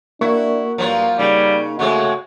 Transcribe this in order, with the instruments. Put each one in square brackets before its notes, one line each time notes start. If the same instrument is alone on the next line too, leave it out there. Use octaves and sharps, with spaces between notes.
[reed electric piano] A#3 A#4 C#6 [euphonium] D4 [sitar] E4 F#4
[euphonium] G2 [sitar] F3 F#3 F4
[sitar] C#3 [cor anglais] G3 [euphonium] D#4
[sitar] C#3 G#3 C4 [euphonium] A3 [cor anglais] F#4